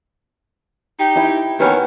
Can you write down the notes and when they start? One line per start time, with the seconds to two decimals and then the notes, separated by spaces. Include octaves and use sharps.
0.99 D#4 G4
1.16 E4 G5
1.60 D#2 B3 C#4 G4 B4